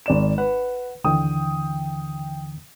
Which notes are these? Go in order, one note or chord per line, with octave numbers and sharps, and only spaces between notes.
G#1 D5 E7
B4 F#5
D#2 D3 E3 G5 D#6